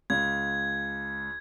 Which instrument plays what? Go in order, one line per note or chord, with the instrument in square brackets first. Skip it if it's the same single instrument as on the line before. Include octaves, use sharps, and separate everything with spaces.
[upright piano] C#2 [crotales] G#6